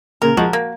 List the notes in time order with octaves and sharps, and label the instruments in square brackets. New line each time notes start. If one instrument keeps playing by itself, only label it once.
[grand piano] A#2 C#3 [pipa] A#4
[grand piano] F3 G#3 [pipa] F#4
[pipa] A#3